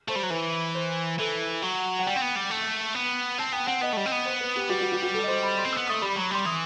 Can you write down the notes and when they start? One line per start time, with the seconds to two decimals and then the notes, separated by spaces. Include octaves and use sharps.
0.08 A3 C5
0.16 G3
0.23 F#3
0.30 E3 B4
0.75 C5
1.19 E3 A4
1.62 F#3 F#5
1.99 F#5
2.06 G3 G5
2.16 C4
2.22 B3
2.36 G3
2.51 A3
2.95 B3
3.38 C4 A5
3.53 B3 G5
3.67 C4 F#5
3.81 B3 D#5
3.93 A3
3.97 G3
4.06 C4
4.12 B3
4.25 C5
4.40 B4
4.56 G4
4.69 G3 F#4
4.81 F#4
4.92 F#4
5.03 F#4
5.14 A4
5.23 D#5
5.28 C5
5.43 B5
5.57 C6
5.64 C4
5.73 E6
5.77 B3
5.87 D#6
5.90 A3
6.02 G3 B5
6.16 F#3
6.22 B5
6.31 G3 C6
6.45 E3 D#6